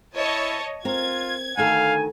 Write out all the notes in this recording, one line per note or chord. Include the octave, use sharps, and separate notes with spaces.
E4 C#5 D#5 A5
C4 F4 A#4 G#6
D2 D#3 A4 F5 G#5